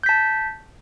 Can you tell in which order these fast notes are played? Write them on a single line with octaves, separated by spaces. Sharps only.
G6 B6 A5